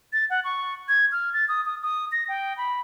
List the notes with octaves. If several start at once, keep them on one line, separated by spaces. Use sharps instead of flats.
A6
F#5
C#6
G#6
F6
A6
D#6
D#6
D#6
A#6
G5
B5